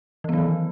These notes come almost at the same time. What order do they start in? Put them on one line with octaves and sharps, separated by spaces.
E3 B3 F#3 D#3